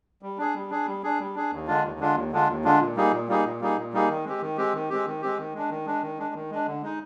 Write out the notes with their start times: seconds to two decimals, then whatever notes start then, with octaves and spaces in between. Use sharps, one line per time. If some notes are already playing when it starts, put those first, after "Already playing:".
0.22 G3
0.38 D4 G#4
0.55 G3
0.70 D4 G#4
0.86 G3
1.04 D4 G#4
1.19 G3
1.35 D4 G#4
1.51 D#2
1.67 D3 G#3 D4 F4
1.83 D#2
1.99 D3 G#3 D4 F4
2.15 D#2
2.32 D3 G#3 D4 F4
2.48 D#2
2.65 D3 G#3 D4 F4
2.80 A#2
2.96 G3 A#3 D#4 G#4
3.12 A#2
3.28 G3 A#3 D#4 G#4
3.45 A#2
3.61 G3 A#3 D#4 G#4
3.77 A#2
3.93 G3 A#3 D#4 G#4
4.09 D#3
4.25 G#3 C4 G4
4.41 D#3
4.57 G#3 C4 G4
4.73 D#3
4.90 G#3 C4 G4
5.05 D#3
5.22 G#3 C4 G4
5.38 D#3
5.54 G#3 D4
5.70 D#3
5.86 G#3 D4
6.02 D#3
6.18 G#3 D4
6.35 D#3
6.51 G#3 D4
6.66 D3
6.83 G#3 D#4